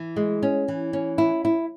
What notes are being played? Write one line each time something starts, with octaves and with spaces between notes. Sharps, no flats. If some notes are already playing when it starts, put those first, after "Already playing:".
Already playing: E3
G#3
C#4
E3
C#4
E4
E4